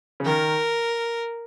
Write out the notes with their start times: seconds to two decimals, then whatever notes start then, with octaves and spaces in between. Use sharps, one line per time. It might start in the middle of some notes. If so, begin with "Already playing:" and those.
0.20 C#3
0.26 D#3 A#4